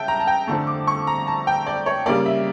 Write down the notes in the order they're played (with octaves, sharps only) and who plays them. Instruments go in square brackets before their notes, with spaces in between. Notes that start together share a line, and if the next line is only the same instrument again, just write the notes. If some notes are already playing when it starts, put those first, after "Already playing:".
Already playing: [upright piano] C#3 E5 G5 A5
A#5
A5
G5
F2 D3 A3 A5
D6
C#6
A#5
A5
G5
D5
C#5
C#3 G3 A#3 D5
E5